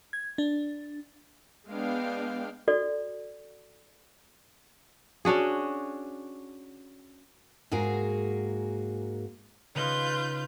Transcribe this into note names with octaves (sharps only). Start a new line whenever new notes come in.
G#6
D4
G#3 B3 D4 F5 G5
F#4 A4 D5
C#4 D4 F#4 G#4
G#2 A#3 F#4 G#4 A#4
C#3 D#4 F4 B4 G6